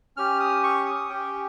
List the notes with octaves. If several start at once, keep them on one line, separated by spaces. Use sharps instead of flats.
C#4 G4 F6
D#6
C#6
D#6
C#4 G4 G5